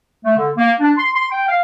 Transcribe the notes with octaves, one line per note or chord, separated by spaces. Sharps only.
A3
D3
A#3
D4
C6
C6
G5
F5